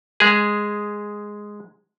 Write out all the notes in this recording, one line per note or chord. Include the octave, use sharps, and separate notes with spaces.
G#3 G#4